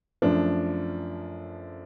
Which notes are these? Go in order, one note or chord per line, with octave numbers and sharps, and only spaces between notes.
F#2 F3 A3 D4